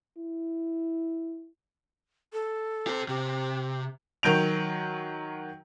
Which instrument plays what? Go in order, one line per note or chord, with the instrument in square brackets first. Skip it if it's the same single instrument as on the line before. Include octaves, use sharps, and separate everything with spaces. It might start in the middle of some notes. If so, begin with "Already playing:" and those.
[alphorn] E4
[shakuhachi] A4
[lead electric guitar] G4 C5
[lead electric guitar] C3 [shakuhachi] G4
[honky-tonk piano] D#3 F#3 G6 D7 F7